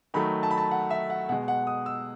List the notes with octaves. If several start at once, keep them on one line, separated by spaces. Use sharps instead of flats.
D#3 F#3 A3 B5
A5
B5
A5
F#5
E5
F#5
B2 G#3 F#5
F#5
D#6
E6